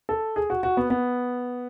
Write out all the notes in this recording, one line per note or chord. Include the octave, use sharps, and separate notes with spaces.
A4
G#4
F#4
F#4
B3
B3